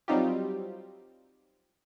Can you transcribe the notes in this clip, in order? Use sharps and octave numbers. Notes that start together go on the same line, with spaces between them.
F#3 G3 C4 D#4 F4 G4